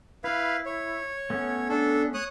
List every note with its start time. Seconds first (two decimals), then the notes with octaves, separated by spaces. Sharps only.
0.24 E4 B4 F5
0.66 C#5
1.30 A3 B3 C#4
1.69 D4 A4
2.14 C#5 D#6 F#6